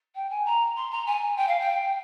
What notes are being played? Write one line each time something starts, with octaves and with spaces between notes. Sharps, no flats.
G5
G#5
A#5
C6
A#5
G#5
G5
F5
G5